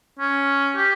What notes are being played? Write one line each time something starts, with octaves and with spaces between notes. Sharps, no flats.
C#4
G4